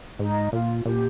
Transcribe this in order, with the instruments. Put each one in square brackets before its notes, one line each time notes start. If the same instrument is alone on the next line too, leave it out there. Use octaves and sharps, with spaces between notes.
[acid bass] G#2 [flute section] D#4
[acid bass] A#2 [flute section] F4
[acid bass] A#2 [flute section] G4